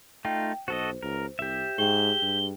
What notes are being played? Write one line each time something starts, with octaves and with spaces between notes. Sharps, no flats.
A3 D#4 F4 G5
B1 F#4 A4 C5 D#5
C#2 A#4
C2 G4 E5
G#2 G#4 G5 G7
G2